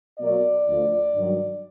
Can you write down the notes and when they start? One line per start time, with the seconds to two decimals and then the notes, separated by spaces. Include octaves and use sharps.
0.19 B2 F#3 A#3 D5
0.67 D2 D3 F3
1.14 G2 D#3 F#3